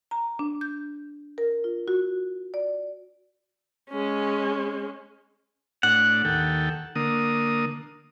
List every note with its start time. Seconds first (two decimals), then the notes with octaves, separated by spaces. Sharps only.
0.11 A#5
0.39 D4
0.61 G6
1.38 A#4
1.64 F4
1.88 F#4
2.54 D5
3.90 G#3 C#4
5.83 A2 D4 F#5
6.25 D#2 A4 G5
6.96 D3 A#3 D#6